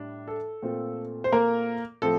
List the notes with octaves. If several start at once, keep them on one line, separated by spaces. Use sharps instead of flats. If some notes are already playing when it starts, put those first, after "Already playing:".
Already playing: A2 G3 D4
A4
A#2 A3 C4 F4
C5
A#3 A#4
A2 F3 C4 A4